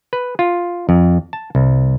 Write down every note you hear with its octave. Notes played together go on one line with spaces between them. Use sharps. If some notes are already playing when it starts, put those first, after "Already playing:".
B4
F4
F2
A5
C2